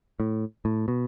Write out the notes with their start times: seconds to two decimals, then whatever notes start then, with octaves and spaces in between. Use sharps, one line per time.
0.20 A2
0.65 A2
0.88 B2